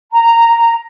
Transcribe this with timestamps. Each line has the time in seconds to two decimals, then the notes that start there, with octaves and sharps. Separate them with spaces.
0.13 A#5